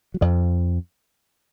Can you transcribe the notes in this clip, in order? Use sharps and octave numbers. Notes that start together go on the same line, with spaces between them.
F#3
F2 F3